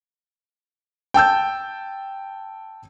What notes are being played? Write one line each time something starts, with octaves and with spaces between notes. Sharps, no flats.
G5 A5 E6 G6